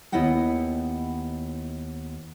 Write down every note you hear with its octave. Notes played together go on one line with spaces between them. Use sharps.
D#2 B3 E4 D#5 F#5 G5